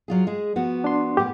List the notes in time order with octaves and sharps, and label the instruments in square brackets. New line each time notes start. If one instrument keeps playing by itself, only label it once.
[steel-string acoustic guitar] F#3 F4 G#4
G#3 G#4
F3 B3 F#4
[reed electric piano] D4 C6
[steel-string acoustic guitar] A2 B3 [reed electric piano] G4